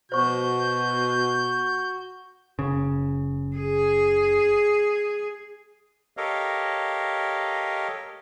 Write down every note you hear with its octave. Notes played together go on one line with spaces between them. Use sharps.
B2 F#4 C5 C#6 G6
F#1 C#3
G#4
G4 A4 A#4 C#5 D#5 F5